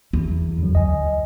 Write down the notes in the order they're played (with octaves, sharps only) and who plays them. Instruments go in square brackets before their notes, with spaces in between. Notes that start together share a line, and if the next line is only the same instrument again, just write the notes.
[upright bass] E2
[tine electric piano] F2 D3 F#3
[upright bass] D2 [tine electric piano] D#5 G#5